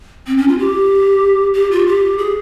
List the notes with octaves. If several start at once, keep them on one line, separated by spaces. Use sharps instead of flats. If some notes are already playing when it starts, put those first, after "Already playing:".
C4
C#4
F4
G4
G4
F4
G4
G#4